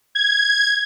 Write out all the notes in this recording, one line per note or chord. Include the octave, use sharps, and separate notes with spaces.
G#6